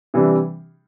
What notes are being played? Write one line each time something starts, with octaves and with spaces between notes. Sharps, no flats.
C3 E3 G3 D4